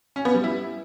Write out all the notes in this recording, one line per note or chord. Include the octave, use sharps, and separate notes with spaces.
C#4
B3
G3
E4